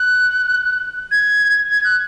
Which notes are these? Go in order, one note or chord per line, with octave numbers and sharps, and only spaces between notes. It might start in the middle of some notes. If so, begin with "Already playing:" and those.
Already playing: F#6
G#6
G#6
F#6